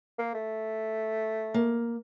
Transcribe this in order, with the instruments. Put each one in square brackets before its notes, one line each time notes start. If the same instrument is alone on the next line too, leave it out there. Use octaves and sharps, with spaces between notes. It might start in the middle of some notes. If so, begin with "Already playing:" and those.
[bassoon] A#3
A3
[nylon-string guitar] A#3